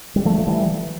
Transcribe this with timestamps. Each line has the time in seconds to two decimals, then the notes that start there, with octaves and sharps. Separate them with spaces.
0.16 G3
0.25 F3 A3
0.39 F3
0.47 E3 G3